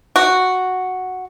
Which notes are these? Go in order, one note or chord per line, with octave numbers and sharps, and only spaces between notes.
F#4